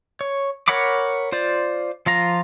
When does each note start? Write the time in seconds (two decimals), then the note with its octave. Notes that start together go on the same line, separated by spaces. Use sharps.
0.21 C#5
0.68 A#4 C#5 F#5 B5 D6
1.32 F4 C5 D5
2.06 F3 F4 A#5